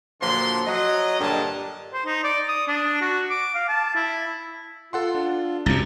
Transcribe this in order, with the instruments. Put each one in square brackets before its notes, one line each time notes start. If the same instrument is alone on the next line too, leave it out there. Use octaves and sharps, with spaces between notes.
[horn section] A#2 D3 F3 F#3 D4 C6
F#3 D#5
G2 A#2 D3 G4 A#4 A5
[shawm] C5
D#4
D5
D#6
D4
F#4
D6
F5
A5
E4
[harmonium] F4 [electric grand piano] A4 F#5 C6
[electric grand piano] D4
[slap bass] C2 F#2 C3 [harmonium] A#5 [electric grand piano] A6